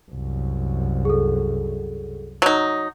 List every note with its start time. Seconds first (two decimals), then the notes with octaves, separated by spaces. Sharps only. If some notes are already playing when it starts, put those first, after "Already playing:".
0.10 C2 F#2
1.05 G#4 A4
2.42 F#3 D#4